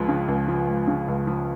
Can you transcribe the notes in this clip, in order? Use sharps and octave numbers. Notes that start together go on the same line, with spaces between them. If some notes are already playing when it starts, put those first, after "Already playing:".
Already playing: C#2 F3 G#3
C#3
C#2
F3
G#3
C#3
C#2
F3